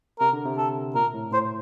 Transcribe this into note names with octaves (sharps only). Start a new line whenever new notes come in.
C3 A#4
D3
C3
A4
A#2 A#4
A2
A2 C5